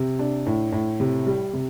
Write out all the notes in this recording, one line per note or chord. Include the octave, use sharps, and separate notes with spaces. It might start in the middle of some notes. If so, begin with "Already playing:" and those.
Already playing: C3
D4
A2
A2
C3
G3
C3